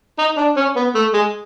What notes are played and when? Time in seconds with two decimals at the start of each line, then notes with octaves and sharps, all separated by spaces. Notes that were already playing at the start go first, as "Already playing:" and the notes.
0.18 D#4
0.37 D4
0.56 C#4
0.76 B3
0.95 A3
1.13 G#3